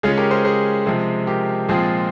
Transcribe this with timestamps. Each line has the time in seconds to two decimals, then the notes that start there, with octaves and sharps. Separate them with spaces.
0.03 C#3 G#3 C#4 F4 G#4
0.18 G4 A#4
0.31 G#4 C5
0.44 G#4 C5
0.86 C3 F3 G#3 C4
1.27 G4 A#4
1.69 A#2 F3 G#3 C4 F4 G#4